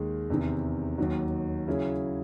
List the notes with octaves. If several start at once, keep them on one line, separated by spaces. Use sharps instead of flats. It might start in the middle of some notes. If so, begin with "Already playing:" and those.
Already playing: D#2 D#3 G#3
E2 C3 D#3
D#2 D#3 F#3
C#3 F#3 C#4 E4 G#4